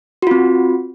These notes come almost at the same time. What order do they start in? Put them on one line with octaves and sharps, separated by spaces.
F#4 F4 C4